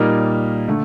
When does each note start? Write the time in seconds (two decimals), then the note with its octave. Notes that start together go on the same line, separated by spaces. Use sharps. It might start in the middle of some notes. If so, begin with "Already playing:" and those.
Already playing: A#2 G3 A#3 D#4 A#4
0.68 D3 A3